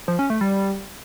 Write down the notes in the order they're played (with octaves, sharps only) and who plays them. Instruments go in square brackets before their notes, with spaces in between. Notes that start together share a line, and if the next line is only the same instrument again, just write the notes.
[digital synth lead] F3
C#4
A3
G3